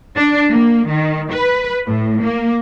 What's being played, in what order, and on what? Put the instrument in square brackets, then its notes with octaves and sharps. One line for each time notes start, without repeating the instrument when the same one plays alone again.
[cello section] D4
A#3
D#3
B4
A2
A#3